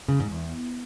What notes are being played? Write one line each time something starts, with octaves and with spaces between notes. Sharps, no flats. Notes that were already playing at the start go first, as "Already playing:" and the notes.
C#3
G#2
E2